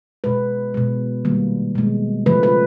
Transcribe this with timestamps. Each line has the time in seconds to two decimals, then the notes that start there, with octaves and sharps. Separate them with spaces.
0.24 B2 G#3 B4
0.74 B2 G#3
1.25 D#3 G3 A#3
1.75 B2 G#3
2.26 C#3 F3 A3 B4
2.43 B4